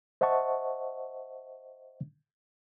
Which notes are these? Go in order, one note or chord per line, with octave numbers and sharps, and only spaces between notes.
C5 D#5 E5 F#5 A5 C#6